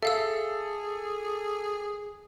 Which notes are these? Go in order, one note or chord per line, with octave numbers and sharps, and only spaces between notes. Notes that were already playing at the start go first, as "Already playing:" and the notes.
G#4 A4 E5 F5 E6